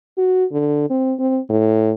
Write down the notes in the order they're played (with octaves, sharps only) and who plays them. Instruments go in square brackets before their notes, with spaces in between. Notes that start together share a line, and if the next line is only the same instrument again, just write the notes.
[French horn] F#4
D3
C4
C4
A2